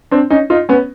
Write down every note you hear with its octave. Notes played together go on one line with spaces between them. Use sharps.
C4 D4
C#4 D#4
D#4 F4
B3 C#4